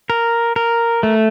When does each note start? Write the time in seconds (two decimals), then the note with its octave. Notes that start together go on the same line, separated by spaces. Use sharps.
0.10 A#4
0.56 A#4
1.03 A3